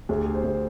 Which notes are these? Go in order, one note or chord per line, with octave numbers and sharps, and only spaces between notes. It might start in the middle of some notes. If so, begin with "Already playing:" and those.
D2 G#4
G4
D3 G#4
C5
D2